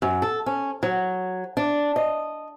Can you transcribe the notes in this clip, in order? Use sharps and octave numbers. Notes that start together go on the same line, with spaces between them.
F#2
A4
C#4
F#3
D4
D#5